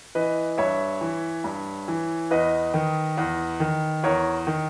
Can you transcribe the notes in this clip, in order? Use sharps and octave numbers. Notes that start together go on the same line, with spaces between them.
E3 B4 D#5
G2 C#5 E5
E3
G2
E3
E2 B4 D#5
D#3
E2
D#3
E2 A#4 C#5
D#3